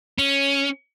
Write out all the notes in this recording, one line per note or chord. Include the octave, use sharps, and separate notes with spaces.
C#4